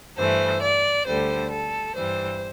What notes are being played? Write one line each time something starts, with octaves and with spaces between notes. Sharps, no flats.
G2 E3 A3 C5
D5
D2 D3 G3 C5
A4
G2 E3 G3 C5